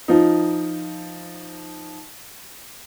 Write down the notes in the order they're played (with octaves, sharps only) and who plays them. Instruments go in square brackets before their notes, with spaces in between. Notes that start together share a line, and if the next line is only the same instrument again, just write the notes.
[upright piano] F3 D#4